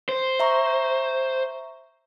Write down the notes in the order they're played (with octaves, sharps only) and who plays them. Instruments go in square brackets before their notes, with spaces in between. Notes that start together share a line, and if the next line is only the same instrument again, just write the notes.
[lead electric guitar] C5
[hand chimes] E5 A#5 C#6